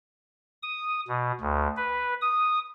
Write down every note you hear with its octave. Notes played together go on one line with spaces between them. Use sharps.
D#6
B2
D2
B4
D#6